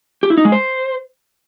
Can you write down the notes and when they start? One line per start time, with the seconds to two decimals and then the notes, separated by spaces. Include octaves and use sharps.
0.23 G4
0.30 E4
0.38 D#4
0.45 G#3
0.52 C5